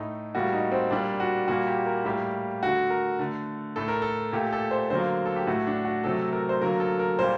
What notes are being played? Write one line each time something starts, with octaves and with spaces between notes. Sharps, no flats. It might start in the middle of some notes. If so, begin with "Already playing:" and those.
Already playing: A2 A3 D#4
A2 G3 A#3 F#4
D#4
C4
A#2 G3 A#3 D4
F#4
A#2 G3 A#3 F#4
G4
A#4
A2 G3 A#3 G4
D3 A3 F#4
A#4
D3 A3
A2 A3 A4
A#4
A4
A#2 A3 G4
A4
C5
D3 F#3 A#3 C5
A4
G4
A2 A3 F#4
D4
F#4
C3 F#3 A3 A4
A#4
C5
D3 F#3 A#3 A#4
A4
A#4
A#2 G3 A#3 C5